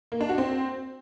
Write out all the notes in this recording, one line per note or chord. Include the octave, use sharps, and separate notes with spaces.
A#3
D4
F#4
C4